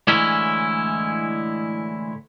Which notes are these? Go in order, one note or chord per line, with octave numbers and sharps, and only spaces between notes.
A2 D3 E3 G#3 C#4 E4